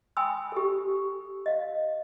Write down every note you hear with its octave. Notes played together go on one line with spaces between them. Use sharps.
G5 G#5 B5 C6 D#6 E6
G4 A4
D#5 F5